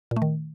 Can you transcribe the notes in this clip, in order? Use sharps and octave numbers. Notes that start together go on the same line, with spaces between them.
A#2
A3
D#3